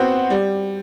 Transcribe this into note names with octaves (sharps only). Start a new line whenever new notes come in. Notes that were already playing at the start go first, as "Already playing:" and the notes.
Already playing: B3 C4 F#4 C5
G3